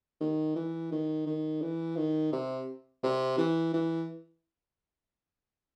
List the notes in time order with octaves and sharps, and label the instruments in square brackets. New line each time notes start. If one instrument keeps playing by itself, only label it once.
[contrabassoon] D#3
E3
D#3
D#3
E3
D#3
C3
C3
E3
E3